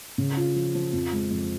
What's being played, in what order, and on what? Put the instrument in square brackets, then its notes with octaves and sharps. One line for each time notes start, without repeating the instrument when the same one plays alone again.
[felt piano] C#3
F4
F3
F3
F2
G#3
F2